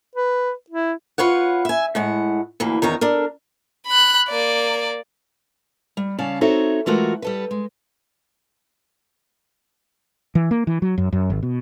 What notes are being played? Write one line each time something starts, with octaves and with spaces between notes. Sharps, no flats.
B4
E4
F4 B4 C#5 F#5
E5 G#5
A2 G#3 F#5
D2 E3 A#3
E2 D#3 C#5 A#5
D4 A4 A#4
B5 F#6
A#3 D5
G3
C#3 C#4 D5 F5 A5
C4 D#4 F#4 A4 C#5 E5
E3 G#3 A3 F4 F#4 A#4
G3 A4 B4
G#3
E3
A#3
E3
F#3
F#2
F#2
G#1
B2